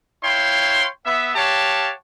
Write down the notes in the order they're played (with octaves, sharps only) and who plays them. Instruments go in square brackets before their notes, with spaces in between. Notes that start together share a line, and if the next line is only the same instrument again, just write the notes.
[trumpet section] E4 C#5 F5 G5 C6
B3 E5
G4 C#5 F5 F#5 A5